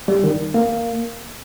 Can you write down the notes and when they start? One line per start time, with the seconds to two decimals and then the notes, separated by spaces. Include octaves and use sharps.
0.08 G3
0.24 D#3
0.54 A#3